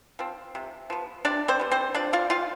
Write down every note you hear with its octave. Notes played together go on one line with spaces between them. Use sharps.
F3 C4
C3
F3 B3
C3 D4 D5
C4 C5
G3 B3
C4 C5
F3 D4 D5
F4 F5
C4 F4 F5